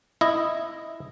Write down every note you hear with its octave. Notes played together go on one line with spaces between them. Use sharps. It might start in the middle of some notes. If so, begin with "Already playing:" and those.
E4 D#5